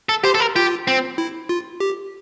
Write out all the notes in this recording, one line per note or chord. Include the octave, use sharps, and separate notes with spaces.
A4
G4 C5
A4
A#4
F4 G4
C4
E4
F4
G4